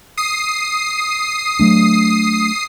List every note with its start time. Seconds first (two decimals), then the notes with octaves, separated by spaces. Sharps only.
0.17 D#6 C7
1.59 F#3 A3 D4